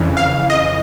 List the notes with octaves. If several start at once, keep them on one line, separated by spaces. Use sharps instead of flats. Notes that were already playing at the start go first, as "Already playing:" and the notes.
Already playing: F2 C#3 E3
F5
D#5